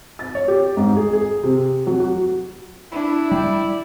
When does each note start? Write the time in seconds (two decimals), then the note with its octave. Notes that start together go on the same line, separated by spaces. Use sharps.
0.19 A6
0.35 C#5
0.48 G4
0.77 G#2
0.97 G#4
1.13 G#4
1.43 C3
1.87 F#3
2.00 F#4
2.92 D4 E4
3.32 G3 D5